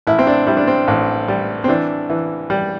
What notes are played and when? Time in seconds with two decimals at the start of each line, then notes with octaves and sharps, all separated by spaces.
0.07 A1 E4
0.19 C4
0.27 D4
0.46 G3 E4
0.57 D4
0.67 C4
0.88 A1
1.28 G3
1.64 C4
1.68 E3 D4
2.09 E3
2.50 G3